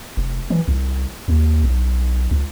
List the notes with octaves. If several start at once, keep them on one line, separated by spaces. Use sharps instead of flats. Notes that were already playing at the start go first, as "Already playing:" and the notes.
F1
E3
C2
D#2
B1
C#2